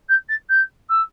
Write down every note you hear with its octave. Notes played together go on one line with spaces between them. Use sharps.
G6
A6
G6
E6